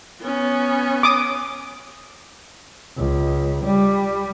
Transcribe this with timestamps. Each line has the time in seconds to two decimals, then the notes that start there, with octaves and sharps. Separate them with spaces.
0.21 B3 C#4
1.03 D6 D#6
2.97 C#2
3.65 G3